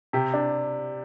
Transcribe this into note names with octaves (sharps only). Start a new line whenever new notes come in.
C3 G4
D4